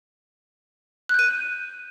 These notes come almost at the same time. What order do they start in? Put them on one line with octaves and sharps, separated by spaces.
F#6 G6 D#7